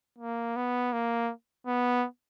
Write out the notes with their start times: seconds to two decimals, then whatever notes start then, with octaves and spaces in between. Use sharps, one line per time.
0.19 A#3
0.56 B3
0.93 A#3
1.67 B3